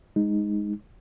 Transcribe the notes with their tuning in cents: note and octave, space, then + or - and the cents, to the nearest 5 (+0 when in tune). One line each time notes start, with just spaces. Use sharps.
G#3 -5 D#4 +0